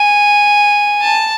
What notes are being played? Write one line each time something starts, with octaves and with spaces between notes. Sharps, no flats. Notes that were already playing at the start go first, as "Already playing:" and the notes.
Already playing: G#5
A5